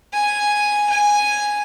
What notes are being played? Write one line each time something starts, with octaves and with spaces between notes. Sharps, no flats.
G#5
G#5